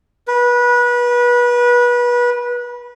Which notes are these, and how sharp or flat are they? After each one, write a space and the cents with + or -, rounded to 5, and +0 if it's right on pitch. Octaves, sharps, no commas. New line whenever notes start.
B4 -25